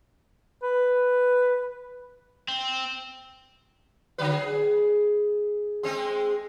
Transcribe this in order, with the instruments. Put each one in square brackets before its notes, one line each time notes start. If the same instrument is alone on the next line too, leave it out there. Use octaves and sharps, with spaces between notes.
[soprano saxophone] B4
[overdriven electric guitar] C4
[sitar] D3 F#3 B4
G#4
G#3 C4 G#4